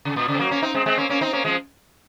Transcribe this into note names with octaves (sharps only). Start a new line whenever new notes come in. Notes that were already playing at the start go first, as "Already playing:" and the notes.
C#3
A#2
C#3
C4
F#3 A#3
A#3 C#4
C4 D#4
G#3 C4
G#3 C4
A#3 C#4
A#3 C#4
C4 D#4
A#3 C#4
F3 G#3